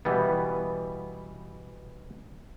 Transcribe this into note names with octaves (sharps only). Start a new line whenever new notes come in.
B2 E3 G3 B3